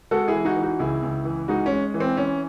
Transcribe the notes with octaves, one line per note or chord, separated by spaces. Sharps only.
G#3 F#4 A4
E4 G#4
E3
D#4 F#4
E3
D#4 F#4
C#2 E4 G#4
C#2
E3
G#3 D#4 F#4
C#4
G#3
E3
C4
E3 C#4